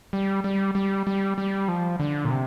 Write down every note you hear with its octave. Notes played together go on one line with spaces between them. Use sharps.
G3
G3
G3
G3
G3
F3
D3
A#2
C3